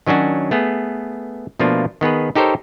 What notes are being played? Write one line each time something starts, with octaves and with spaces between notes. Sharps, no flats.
D#3 F#3 C#4 D4 F#4
A3 B3 G#4
B2 F3 A3 A#3 D4 F4
D#3 B3 G#4 B4
D#4 G4 A4 A#4 C5 C#5